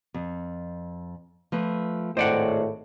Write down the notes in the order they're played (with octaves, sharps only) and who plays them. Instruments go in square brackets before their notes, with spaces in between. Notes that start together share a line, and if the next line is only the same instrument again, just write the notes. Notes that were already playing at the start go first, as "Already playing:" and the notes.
[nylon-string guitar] F2
F3 A3 B4
[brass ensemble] G#1 A2 [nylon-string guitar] G#4 D#5 [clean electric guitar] C5 D5 F#5